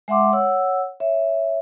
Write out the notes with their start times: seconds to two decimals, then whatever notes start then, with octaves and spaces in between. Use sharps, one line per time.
0.08 G#3 E5 F#5 C6 D6
0.33 C#5 F#5 E6
1.00 C#5 E5